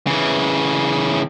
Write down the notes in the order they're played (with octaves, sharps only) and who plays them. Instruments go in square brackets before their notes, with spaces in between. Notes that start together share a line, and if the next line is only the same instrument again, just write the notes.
[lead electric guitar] C#3 E3